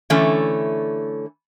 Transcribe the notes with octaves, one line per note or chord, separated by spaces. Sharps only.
D3 E3 A3 C#4